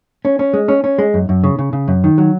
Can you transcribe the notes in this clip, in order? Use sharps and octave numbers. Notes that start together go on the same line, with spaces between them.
C#4
C#4
G#3
C#4
C#4
G#3
F#2
F#2
C#3
C#3
C#3
F#2
D#3
F#3